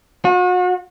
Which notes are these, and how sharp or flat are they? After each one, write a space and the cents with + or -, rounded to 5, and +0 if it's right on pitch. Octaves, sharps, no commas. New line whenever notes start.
F#4 -40